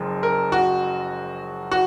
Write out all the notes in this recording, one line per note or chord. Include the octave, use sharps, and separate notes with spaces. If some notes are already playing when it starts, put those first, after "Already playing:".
Already playing: F#1 F#2 F3 G#3
A#4
F#4
F#4